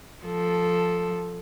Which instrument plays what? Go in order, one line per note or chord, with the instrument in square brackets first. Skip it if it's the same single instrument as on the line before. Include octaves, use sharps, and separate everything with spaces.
[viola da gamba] F3 A4